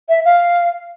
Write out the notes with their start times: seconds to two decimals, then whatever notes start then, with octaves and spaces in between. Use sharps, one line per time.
0.09 E5
0.25 F5